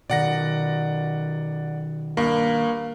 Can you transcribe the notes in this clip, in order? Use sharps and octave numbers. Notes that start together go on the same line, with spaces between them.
B2 D#3 D5 F#5 A#6
G2 A#3